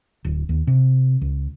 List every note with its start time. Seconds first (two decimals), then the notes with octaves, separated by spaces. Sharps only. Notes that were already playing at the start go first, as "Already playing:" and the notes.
0.25 D1
0.49 D#2
0.67 C3
1.22 C#2